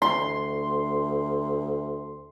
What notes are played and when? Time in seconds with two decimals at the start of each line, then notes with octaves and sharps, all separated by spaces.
0.02 D2 C6